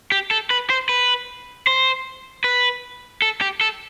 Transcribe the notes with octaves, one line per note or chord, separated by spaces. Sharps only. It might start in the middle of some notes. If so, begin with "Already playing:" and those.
G4
A4
B4
C5
B4
C5
B4
A4
G4
A4